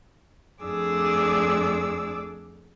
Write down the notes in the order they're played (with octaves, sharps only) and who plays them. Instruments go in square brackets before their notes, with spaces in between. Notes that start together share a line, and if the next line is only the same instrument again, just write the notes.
[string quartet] F2 A3 D4 G#4 D6 E6